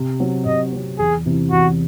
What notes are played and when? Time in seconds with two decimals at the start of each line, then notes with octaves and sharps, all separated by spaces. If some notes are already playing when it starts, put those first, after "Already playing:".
Already playing: C3
0.20 F#3 C4
0.46 C3 D#5
0.72 F#3 C4
0.99 E2 G#4
1.25 C3 E3 C4 E4
1.51 E2 F#4